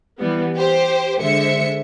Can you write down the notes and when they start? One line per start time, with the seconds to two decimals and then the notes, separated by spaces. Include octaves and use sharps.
0.19 E3 G3 B3
0.56 G4 C5
1.20 D3 G#3 C5 E5 C#7